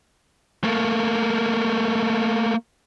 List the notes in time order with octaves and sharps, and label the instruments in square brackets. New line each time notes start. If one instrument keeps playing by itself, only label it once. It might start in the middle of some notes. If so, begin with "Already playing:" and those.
[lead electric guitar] A3 A#3